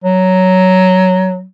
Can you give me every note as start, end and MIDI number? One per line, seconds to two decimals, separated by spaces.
0.04 1.44 54